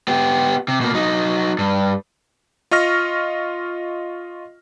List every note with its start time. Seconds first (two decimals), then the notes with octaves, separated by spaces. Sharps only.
0.08 B3 G4
0.68 C3
0.81 B2 A#3
0.94 F#3 D#4
1.59 G2
2.71 F4 D#5 C#6 F6 A#6